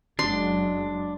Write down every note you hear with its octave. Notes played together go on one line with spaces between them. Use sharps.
F#1 F#3 G#3 D4 C6